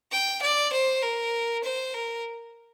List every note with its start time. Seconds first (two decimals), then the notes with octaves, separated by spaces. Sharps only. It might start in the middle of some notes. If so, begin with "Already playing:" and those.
0.12 G5
0.42 D5
0.72 C5
1.02 A#4
1.63 C5
1.94 A#4